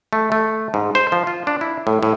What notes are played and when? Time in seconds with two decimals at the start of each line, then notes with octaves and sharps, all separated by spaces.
0.13 A3
0.32 A3
0.74 G#2
0.95 C5
1.12 F3
1.27 F4
1.47 D4
1.61 E4
1.87 A2
2.03 A2